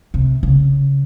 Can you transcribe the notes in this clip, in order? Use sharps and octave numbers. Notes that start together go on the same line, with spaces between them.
C3
C#3